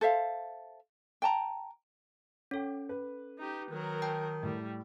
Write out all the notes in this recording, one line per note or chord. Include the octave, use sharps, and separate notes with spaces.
A4 C5 E5 F5
G5 A5 A#5
C#4 A4 C#5 G5
B4
D#4 G4
D#3 F#3 A#4
G5 A5 G6
A2 G3